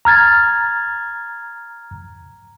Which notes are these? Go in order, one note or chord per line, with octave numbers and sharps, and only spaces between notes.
A#5 F6 G#6 A6